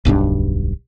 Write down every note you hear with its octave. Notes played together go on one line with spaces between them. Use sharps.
D1 B1 G2 D4